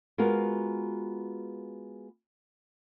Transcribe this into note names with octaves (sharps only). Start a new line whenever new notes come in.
G#3 B3 F4 F#4 A#4